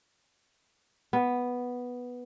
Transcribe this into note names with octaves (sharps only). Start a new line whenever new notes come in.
B3